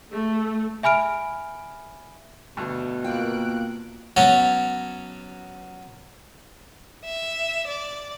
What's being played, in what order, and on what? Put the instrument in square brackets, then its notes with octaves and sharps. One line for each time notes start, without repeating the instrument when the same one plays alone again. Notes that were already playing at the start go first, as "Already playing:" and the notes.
[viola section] A3
[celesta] E5 G#5 B5 F6 D7
[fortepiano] D2 G2 [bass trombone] B2
[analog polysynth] A#3 F#6 D7 [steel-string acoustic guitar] F4 G5
[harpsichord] F#3 B3 C#4 F#4 A5
[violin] E5
D5